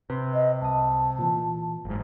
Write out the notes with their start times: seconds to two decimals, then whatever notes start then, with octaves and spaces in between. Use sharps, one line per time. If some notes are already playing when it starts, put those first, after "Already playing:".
0.10 C3 B4 C6
0.34 D#5
0.62 C2 A5 D#6
1.19 A#2 E3
1.85 F#1 G#2